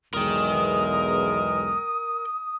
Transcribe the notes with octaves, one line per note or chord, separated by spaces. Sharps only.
B1 E2 G#3 A#4 G5 D#6